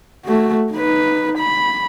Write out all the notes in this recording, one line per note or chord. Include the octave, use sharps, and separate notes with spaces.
A3 F#4
D#4 B4
B5